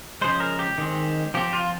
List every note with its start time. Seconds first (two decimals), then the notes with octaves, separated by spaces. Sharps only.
0.21 C#3 F3 G#3 C5
0.40 A#4
0.59 G4
0.78 D#3 G#3 C4
1.34 F3 C4 G4
1.53 F4